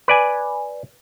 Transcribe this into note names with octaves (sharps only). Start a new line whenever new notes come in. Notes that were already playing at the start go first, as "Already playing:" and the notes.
B4 D5 G#5